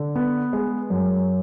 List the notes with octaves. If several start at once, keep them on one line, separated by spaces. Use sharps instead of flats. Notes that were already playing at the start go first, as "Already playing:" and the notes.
Already playing: D3
B3
G#3
F#2